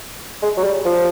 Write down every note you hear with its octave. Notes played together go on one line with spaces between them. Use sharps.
G#3
F#3
G3
F3